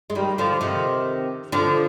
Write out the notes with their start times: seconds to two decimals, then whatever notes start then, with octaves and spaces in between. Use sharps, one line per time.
0.10 G#3
0.15 D#3 G3
0.38 D3 F3
0.61 C3 D#3
1.52 D3 F3